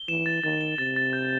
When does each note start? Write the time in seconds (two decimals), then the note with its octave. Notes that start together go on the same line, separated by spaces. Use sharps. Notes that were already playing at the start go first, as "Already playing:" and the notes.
Already playing: G7
0.08 E3 E7
0.26 A6
0.44 D#3 A6
0.61 G7
0.78 C3 A6
0.96 A6
1.13 G6